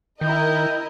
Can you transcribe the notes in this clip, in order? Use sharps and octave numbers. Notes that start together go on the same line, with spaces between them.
D#3 E4 A#4 D#5 G5